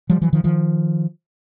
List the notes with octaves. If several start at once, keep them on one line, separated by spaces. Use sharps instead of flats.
F3 G3
E3 F#3
D#3 F3
D#3 F3